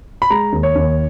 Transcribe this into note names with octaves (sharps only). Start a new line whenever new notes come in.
B5
G#3 A#5
D#2
C#5
D#2